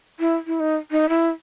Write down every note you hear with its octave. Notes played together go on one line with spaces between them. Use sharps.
E4
E4
D#4
D#4
E4